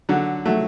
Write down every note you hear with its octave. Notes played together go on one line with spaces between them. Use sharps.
D3 F#3
F#3 A3